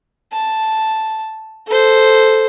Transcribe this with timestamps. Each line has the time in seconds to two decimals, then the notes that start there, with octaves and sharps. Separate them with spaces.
0.32 A5
1.67 A4 C5